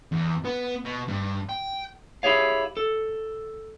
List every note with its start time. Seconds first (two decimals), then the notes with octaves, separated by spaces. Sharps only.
0.12 E2
0.45 B3
0.85 B2
1.09 G2
1.49 G5
2.23 E4 G4 G#4 C#5 F5
2.77 A4